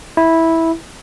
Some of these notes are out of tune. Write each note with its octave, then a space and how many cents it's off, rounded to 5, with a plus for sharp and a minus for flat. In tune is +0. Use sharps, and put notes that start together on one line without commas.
E4 -10